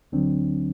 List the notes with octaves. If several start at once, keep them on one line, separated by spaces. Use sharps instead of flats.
D2 D3 F#3 C4 D4